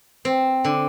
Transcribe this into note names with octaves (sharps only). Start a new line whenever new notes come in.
C4
D3